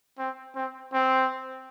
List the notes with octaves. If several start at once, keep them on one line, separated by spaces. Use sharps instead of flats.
C4
C4
C4